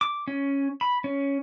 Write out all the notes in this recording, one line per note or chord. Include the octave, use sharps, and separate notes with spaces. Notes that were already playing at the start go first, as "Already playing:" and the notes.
D6
C#4
B5
C#4